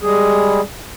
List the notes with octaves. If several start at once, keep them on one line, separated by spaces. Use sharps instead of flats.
G3 G#3 G#4